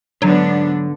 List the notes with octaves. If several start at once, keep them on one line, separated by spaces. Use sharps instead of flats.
G#2 D3 F#3 B3 D4